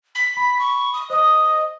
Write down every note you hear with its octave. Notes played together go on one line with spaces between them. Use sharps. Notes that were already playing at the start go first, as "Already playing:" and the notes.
B6
B5
C#6
D#6
C5 D#5 D#6